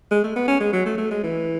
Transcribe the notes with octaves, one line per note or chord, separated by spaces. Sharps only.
G#3
A3
B3
C#4
G#3
F#3
A3
A3
G#3
E3